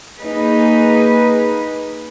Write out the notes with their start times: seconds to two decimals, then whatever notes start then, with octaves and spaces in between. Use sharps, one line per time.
0.18 A#3 D#4 G#4 B4